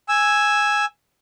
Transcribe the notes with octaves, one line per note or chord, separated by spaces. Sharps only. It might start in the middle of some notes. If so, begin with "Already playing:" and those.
G#5 E6